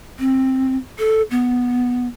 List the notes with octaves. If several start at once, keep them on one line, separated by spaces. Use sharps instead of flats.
C4
A4
B3